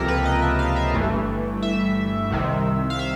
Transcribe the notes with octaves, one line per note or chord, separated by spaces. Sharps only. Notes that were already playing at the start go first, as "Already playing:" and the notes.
Already playing: C#2 C3 F3 A#3 G4 A4 A#4
B4
D#5
E5
F5
E5
G1 G2 E3 A3
E5
C2 C3 D#3
F5
E5